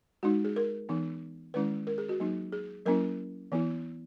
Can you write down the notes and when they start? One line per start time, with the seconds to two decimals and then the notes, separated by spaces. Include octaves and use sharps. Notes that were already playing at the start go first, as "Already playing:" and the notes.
0.23 G#3 D#4 F#4
0.45 G#4
0.56 A#4
0.89 E3 B3 D#4
1.54 D#3 G#3 C#4 E4 B4
1.87 A#4
1.98 G#4
2.09 F#4
2.20 F#3 A#3 D#4
2.52 G#4
2.86 F#3 A#3 C#4 E4 A#4
3.52 E3 B3 E4